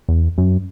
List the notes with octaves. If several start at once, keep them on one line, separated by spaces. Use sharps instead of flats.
E2
F#2